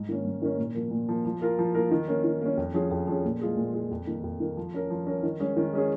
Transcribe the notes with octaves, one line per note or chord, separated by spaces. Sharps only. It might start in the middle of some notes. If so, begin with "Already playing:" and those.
Already playing: G#2
D#3 A#3 C#4
G#2
D#3 A#3 C#4
A#2
F3 A#3
A#2
F3 A#3
F3
A#3 F4 A#4
F3
A#3 F4 A#4
D#3
A#3 C#4
D#3
A#3 C#4
F2
F3 C#4 G#4
F2
F3 C#4 G#4
A#2
G#3 F4 G#4
A#2
G#3 F4 G#4
F2
D#3 A#3
F2
D#3 A#3
F3
C#4 A#4
F3
C#4 A#4
D#3
G#3 C#4 G#4
D#3
G#3 C#4 G#4